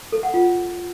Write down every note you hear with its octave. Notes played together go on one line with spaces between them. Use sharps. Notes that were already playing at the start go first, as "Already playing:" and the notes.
A4
F#5
F4